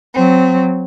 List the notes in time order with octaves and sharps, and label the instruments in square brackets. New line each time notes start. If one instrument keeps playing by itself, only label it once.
[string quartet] F#3 C4